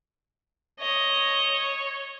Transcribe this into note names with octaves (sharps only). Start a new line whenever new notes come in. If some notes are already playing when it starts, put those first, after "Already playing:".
C#5 D#5